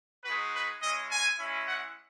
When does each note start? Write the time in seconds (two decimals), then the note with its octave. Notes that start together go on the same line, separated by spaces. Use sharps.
0.25 G#3 D#4 F#4 B4
0.54 B4
0.83 G#3 C#4 E4 D#5
1.10 G#5
1.39 G#3 C#4 E4
1.67 F#5